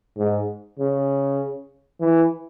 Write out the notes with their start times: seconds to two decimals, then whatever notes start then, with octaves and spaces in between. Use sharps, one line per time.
0.17 G#2
0.79 C#3
2.00 E3